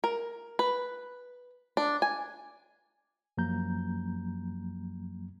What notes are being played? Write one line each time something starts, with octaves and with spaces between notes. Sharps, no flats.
A#4
B4
D4
G#5
F#2 F3 F#3 A#3 A#5 G6